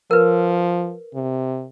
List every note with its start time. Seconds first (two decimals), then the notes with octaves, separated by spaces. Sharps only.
0.11 F3 A#4 B4
1.15 C3